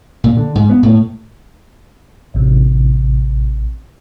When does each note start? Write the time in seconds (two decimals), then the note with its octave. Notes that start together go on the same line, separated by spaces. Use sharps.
0.24 A#2
0.37 D3
0.55 G#2
0.70 B3
0.83 A2
2.34 A1 C3